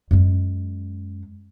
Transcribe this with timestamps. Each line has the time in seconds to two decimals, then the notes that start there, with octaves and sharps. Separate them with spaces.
0.11 F#2 G#3